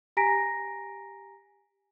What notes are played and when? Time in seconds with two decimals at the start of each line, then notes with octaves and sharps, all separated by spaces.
0.17 G4 G#5 A#5 A#6 B6 D7